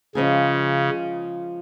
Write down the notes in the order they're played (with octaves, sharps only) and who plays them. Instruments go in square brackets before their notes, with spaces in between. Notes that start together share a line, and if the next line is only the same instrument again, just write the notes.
[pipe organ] C#3 [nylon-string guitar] F3 G#3 C#4 G#4